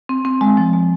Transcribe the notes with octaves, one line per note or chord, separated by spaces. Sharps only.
C4
C4
G#3
F3
G#3